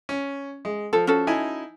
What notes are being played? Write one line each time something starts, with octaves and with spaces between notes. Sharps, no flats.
C#4
G#3
F3 A4
C#4 F#4 A4
D#4 E4 G#5